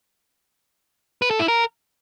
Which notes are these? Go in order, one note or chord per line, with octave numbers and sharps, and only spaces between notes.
B4
A4
E4
A#4